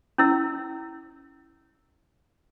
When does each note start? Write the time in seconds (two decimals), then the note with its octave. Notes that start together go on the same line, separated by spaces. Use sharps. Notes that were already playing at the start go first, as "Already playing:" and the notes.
0.18 C#4 E4 E6